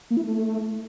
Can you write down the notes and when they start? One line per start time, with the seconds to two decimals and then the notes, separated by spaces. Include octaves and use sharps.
0.10 A#3
0.17 E4
0.23 A3